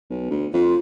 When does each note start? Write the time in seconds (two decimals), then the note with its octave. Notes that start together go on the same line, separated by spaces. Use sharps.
0.10 B1
0.31 D2
0.53 F2 F4